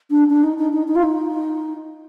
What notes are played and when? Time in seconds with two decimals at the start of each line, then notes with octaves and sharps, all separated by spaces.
0.10 D4
0.29 D4
0.43 D#4
0.58 D#4
0.72 D#4
0.87 D#4
0.95 F4
1.02 D#4